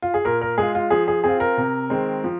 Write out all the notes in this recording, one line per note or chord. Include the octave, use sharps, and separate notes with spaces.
F4
G#4
A#2 A#4
A#4
G#3 F4 G#4
F4
F3 G#4
G#4
C4 F4 G#4
A#4
C3
D#3 G#3 C4
F3